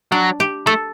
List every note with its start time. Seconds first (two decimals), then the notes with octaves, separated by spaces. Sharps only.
0.12 F#3 D4
0.40 G4
0.67 A3 A4